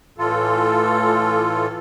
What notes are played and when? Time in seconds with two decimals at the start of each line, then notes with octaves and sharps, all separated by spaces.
0.18 A2 E3 F4 A4